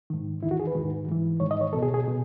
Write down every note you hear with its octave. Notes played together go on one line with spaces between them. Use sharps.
G#2 D#3
E2 D#3 E4
F#4
G#4
B4
G#2 D#3
G#2 E3
G#2 D#3 C#5
D#5
C#5
C#2 B2 A4
G#4
G#4
B2